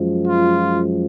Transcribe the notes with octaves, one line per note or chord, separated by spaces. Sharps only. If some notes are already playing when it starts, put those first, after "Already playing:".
Already playing: F#2 F3 G#3
F4